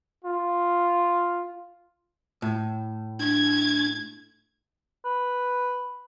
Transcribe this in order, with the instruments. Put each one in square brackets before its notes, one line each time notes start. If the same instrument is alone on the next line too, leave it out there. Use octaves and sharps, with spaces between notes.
[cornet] F4
[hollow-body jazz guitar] A2
[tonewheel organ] D4 [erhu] G#6
[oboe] B4